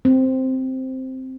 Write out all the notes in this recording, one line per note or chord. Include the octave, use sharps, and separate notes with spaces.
C4